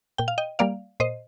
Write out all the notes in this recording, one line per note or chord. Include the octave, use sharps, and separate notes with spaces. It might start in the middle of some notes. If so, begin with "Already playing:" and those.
A#2 G5
F5
D#5 G5
G3 A#3 D5 F5
A#2 C5 D#5